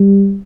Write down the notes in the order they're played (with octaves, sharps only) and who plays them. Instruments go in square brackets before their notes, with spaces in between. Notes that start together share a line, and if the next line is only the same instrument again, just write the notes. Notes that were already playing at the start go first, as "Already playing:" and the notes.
Already playing: [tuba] G3